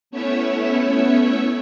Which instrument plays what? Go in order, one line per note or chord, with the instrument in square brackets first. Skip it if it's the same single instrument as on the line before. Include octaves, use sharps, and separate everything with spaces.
[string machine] A3 B3 C#4 E4 C#5 E5